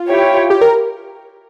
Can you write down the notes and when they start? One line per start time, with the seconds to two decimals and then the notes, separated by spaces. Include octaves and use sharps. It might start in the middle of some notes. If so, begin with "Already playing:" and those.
Already playing: F4
0.09 E4 G4 C#5 G5
0.50 G4
0.61 A#4